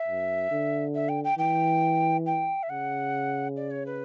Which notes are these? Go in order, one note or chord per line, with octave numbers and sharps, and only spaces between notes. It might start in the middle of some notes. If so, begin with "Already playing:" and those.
Already playing: E5
F#2
D3
E5
G5
G5
E3 G5
G5
E5
C#3 F#5
D5
C#5
B4